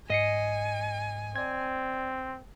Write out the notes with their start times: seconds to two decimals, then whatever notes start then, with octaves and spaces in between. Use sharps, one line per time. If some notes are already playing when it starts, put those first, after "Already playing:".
0.10 G#2 D#5 G#5 C7 C#7
1.36 C4 D5 G#6